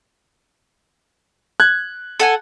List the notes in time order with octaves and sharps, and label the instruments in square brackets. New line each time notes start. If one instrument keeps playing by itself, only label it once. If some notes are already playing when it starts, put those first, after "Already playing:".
[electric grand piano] F#6 G#6
[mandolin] A4 F#5 G#5